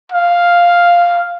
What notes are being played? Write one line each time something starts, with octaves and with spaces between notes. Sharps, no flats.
F5